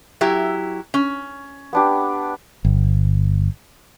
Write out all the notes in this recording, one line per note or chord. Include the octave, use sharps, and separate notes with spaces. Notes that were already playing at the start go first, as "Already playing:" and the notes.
F#3 E4 G4
C#4
B3 D4 G4
G1